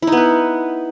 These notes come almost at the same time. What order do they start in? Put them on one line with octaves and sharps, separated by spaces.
E4 D#4 B3 B4